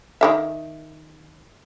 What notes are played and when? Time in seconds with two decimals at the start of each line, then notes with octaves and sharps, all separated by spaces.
0.21 D#3 A#3 E5